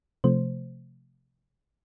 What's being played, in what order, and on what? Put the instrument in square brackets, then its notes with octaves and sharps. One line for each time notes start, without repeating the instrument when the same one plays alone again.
[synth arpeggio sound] C3 F3 A3 C5